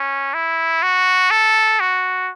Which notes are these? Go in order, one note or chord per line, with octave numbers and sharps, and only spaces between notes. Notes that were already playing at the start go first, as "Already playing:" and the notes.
Already playing: C#4
E4
F#4
A4
F#4